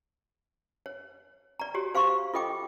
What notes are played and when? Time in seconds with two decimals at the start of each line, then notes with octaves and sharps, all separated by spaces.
0.86 C#5
1.59 D5 A#5
1.74 F#4 G4 C#5
1.95 C5 F5 C6 C#6
2.34 F4 A4 D#5 G5 D6